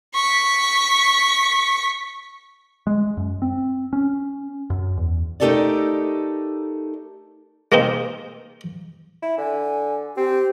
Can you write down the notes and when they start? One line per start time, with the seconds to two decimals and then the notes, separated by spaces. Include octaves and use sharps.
0.15 C#6 B6
2.87 G#3
3.17 F#2
3.42 C4
3.93 C#4
4.70 F#2
4.97 E2
5.40 A3 D#4 G4 A4 A#4 D5
7.72 G#3 A#3 C4 D#4
9.22 E4
9.38 D3 G#5
10.17 C4 G4